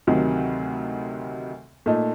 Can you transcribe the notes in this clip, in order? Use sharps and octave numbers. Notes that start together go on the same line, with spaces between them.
D2 C3 D#3 F#3
A#2 A3 D#4